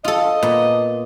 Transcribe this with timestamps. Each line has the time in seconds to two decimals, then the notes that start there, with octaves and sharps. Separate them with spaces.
0.04 F4 A4 D#5
0.43 A#2 B3